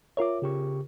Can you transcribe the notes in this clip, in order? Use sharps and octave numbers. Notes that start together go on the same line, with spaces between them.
F4 A#4 C#5 E5 D6
C#3 G4 C#6